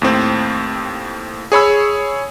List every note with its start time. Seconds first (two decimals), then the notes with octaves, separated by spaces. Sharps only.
0.02 D#2 A2 C4
1.52 G#4 C#5 B5 E6